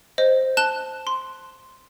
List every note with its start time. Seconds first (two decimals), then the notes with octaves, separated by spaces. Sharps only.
0.18 C5 D#5
0.57 A5 F#6 E7 G7
1.07 C6